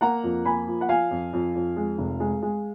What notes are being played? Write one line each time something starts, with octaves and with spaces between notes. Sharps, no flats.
A#3 F#5 A#5
F2
A#3 G#5 B5
F3
F#5
F3 F5 G#5
F2
F2
F2
G#3
F1
G#3
G#3